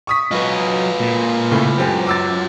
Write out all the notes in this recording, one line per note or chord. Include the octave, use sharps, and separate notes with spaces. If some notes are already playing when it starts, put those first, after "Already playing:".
C#6 D#6 B6
F#3 F4 B4 D#5
A#2
A2 C#3 A3
F#2 C4 G4 G#5
D6 E6 A6